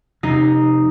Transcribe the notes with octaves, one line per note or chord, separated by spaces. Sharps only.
F2 C3 D#4